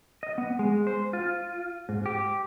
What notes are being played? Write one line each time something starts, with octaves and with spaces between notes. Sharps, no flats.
D#5
B3
G#3
C5
F4
G#2
G4